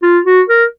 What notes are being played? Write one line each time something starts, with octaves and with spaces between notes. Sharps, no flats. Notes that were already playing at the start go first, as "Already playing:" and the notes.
F4
F#4
A#4